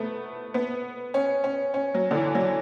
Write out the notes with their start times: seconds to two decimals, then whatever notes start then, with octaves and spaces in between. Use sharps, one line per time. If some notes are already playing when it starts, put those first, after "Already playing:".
Already playing: A3 B3
0.54 B3
1.14 C#4
1.44 C#4
1.74 C#4
1.94 F#3
2.11 D3
2.15 E3
2.35 F#3